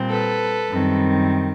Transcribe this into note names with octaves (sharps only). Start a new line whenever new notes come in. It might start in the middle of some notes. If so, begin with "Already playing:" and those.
Already playing: A#2 G3 C4
A4 B4
F#2 D#3 G3 C4